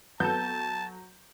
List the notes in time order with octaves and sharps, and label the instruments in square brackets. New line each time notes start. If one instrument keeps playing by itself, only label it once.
[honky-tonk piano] F#3 G6 [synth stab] B3 A4 [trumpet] A5